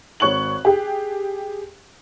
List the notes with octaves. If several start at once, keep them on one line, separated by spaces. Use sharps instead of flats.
G#1 C#5 C#6 F#6 F#7
G4 G#4 G5